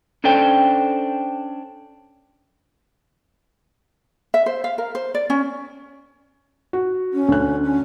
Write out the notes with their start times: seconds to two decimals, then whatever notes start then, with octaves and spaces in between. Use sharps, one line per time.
0.24 C#4 D4 A4 C5 G5
4.34 E5
4.46 C5
4.64 F5
4.78 A#4
4.95 C5
5.15 D5
5.30 C#4
6.73 F#4
7.13 C#4
7.28 D2 D3 F#6
7.63 C#4